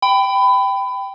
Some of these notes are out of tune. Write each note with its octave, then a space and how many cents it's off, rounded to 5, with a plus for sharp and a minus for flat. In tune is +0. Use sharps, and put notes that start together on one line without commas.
G5 +0 B5 +25